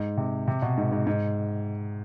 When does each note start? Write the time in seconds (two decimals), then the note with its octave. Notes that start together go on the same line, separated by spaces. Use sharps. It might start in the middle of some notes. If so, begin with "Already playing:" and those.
Already playing: G#2
0.17 C3
0.48 C3
0.62 B2
0.78 G#2
0.92 G#2
1.07 G#2